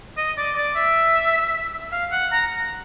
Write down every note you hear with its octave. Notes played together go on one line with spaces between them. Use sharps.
D#5
D5
D5
E5
F5
F#5
A#5